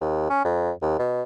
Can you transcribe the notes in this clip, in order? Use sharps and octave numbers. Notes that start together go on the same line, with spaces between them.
D#2
C#4
F2
D#2
B2